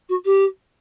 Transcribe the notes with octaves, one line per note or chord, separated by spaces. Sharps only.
F#4
G4